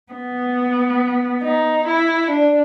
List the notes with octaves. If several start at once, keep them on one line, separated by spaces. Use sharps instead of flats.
B3
D#4
E4
D4